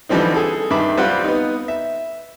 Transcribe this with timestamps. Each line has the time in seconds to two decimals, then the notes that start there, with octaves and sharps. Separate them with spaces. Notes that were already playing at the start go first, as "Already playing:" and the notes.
0.09 D3 E3 F3 G3 C4 D#4
0.34 G#4 A4
0.70 G2 D#3 E5 B5 D6
0.97 G3 C4 F4 B4 F#5
1.24 B3 D#4
1.68 E5